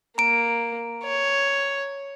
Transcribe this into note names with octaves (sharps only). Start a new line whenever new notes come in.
A#3 A#5 D7
C#5